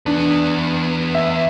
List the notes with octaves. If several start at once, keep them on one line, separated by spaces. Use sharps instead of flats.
E2 B3 D4
E5